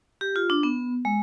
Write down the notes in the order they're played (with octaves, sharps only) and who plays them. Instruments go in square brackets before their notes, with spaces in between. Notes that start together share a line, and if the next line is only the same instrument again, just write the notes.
[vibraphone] G4
F4
D4
B3
G#3